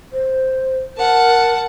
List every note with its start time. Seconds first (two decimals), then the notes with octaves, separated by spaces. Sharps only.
0.13 C5
0.98 A#4 F#5 A5